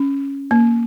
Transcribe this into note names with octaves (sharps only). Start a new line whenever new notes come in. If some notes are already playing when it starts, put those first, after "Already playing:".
Already playing: C#4
A#3